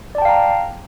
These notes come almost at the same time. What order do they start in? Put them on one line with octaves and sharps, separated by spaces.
D5 A5 G5 F5 A#5